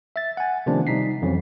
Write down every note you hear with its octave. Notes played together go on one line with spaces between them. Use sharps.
E5 A6
F#5 G#5
C3 D#3 F3 A3 B3 D4
C3 G3 D#4 B6 C7
F2 E3 F#3 C4 C#4